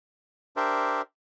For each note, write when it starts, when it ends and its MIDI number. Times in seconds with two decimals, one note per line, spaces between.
0.56 1.02 62
0.56 1.02 67
0.56 1.02 70
0.56 1.02 72
0.56 1.02 74
0.56 1.02 76